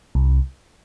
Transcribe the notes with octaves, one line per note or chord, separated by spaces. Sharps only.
C2